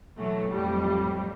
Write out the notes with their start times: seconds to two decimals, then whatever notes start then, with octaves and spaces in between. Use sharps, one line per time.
0.17 B2 E3 F#3 A3
0.53 F2 A2 F#3 G3